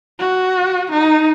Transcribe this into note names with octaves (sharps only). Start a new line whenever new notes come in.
F#4
D#4